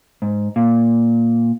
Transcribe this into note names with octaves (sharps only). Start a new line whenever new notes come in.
G#2
A#2